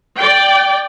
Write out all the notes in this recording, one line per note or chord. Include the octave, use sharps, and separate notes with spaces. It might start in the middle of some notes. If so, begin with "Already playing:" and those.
D5 G5